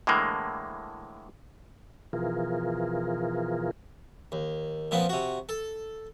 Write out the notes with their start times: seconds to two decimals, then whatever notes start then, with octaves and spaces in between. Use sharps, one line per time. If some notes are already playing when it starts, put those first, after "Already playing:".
0.07 A2 D3 E3 G#3 A#3
2.13 B2 E3 F3 F4 G#4 A#4
4.32 D#2
4.91 A#2 F3 B3 C4
5.09 C3 F#4
5.49 A4